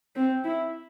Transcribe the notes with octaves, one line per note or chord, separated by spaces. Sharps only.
C4
E4